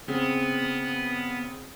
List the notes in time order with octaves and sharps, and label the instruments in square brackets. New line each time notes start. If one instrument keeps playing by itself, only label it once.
[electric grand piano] C#3 C4 G#4 [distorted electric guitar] B3